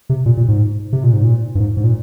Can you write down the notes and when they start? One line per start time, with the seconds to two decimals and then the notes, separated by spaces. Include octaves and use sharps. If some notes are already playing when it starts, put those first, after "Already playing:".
0.09 C3
0.26 A#2
0.37 A#2
0.48 G#2
0.93 C3
1.04 A#2
1.13 G#2
1.24 A#2
1.55 G2
1.60 G#2
1.77 G#2
1.84 A#2